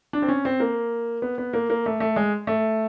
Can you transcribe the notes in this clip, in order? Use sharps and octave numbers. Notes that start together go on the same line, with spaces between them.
D4
C4
C#4
C4
A#3
B3
B3
A#3
A#3
A3
A3
G#3
A3